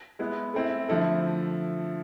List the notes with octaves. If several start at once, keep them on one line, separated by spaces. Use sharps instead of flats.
G#3 B3 E4
A3 C4 E4
D3 F3 A3 E4 A4